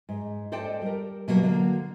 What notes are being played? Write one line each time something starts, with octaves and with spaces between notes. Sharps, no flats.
G#2
A4 C5 D5 D#5 G5 A5
G3 A#4
B2 F#3 G3 A#3
D3 F#3 A#3